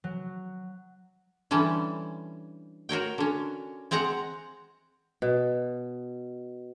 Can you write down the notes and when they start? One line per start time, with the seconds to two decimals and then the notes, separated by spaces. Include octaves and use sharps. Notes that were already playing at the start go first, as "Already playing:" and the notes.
0.04 F#3
1.51 D3 E3 G3 C#4
2.89 F#4 A#4 C#5 G5
3.18 D3 C#4
3.91 G#3 C4 F#5 A#5
5.22 B2